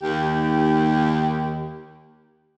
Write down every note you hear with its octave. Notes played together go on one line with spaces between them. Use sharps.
D#2 G4